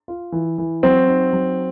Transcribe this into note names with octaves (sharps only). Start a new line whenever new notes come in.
F4
E3
E3
F#3 C4
D#4
F#3